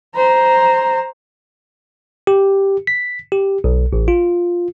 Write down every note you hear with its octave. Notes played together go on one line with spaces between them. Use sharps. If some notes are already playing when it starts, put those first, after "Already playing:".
C5 A#5
G4
B6
G4
B1
A1
F4